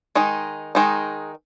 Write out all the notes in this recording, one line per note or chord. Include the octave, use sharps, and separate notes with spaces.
D#3 G#3 D#4
D#3 G#3 D#4